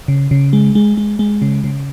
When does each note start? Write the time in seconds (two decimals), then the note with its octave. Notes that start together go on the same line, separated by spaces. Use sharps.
0.08 C#3
0.31 C#3
0.53 G#3
0.75 G#3
0.97 G#3
1.19 G#3
1.42 C#3
1.64 C#3